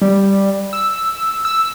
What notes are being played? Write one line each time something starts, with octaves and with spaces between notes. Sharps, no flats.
G3
E6
E6